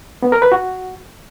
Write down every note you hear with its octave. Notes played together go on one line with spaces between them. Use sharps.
B3
A#4
B4
F#4